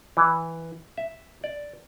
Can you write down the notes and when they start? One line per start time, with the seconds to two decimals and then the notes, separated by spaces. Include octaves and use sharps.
0.17 E3
0.98 E5
1.44 D5